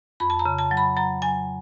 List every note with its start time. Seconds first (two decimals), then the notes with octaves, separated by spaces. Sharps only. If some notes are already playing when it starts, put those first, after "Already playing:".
0.20 F2 B5
0.30 A5
0.39 A#5
0.46 C#3
0.58 A5
0.71 F#3
0.77 B5
0.96 F#3 A#5
1.22 F#3 G#5